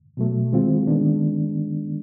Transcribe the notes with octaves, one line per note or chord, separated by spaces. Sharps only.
B2 F#3 A3
D#3 G#3 C4 F4
D#3 G#3 B3 D4